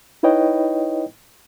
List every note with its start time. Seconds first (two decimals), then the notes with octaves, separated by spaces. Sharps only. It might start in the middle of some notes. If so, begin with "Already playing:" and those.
0.23 D#4 E4 B4 C#5 D#5 G5